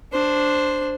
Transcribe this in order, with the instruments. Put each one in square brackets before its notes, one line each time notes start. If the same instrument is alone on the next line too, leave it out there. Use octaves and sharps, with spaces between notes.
[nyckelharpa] D4 C5